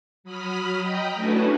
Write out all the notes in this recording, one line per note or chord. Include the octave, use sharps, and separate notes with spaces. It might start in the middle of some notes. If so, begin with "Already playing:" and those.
F#3 B5 D#6 F6 B6
D#5 G5 A#5 B5
A3 C#4 D4 E4 F#4 B4